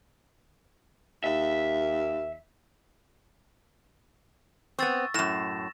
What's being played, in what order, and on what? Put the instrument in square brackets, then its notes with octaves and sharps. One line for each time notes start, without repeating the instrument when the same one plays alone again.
[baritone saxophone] D#2 [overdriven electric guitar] E5
[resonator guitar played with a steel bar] B3 C4 [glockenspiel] C#6 E6 A6
[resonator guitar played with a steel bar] F#2 A2 [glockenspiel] A#6 E7